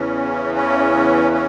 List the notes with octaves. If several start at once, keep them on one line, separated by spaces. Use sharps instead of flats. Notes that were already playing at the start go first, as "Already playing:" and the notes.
Already playing: E2 C#3 E3 C#4
C#4
C#4